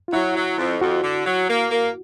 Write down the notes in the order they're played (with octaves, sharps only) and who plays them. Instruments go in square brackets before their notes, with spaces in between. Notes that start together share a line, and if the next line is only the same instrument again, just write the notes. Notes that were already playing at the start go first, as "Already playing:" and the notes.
[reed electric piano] F4
[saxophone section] F#3 [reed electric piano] E4
[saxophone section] F#3
F2
[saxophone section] F2 [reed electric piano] F#4
[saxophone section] D3
F#3
A#3
A#3